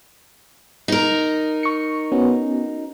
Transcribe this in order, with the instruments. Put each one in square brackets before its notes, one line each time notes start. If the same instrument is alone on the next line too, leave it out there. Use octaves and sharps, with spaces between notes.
[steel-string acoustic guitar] D#4 A#4
[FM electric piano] C#6 C#7
B3 C#4 F#4